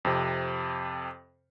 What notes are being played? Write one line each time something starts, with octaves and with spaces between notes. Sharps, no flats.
F2 C3